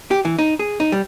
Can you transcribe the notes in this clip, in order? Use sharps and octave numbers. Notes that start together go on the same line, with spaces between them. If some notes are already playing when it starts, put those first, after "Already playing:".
G4
E3
D#4
G#4
D#4
G3